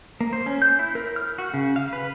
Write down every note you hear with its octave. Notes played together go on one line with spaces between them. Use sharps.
A#3
C5
C#4
G6
E4
A#4
F6
F#4
C#3
F5
B4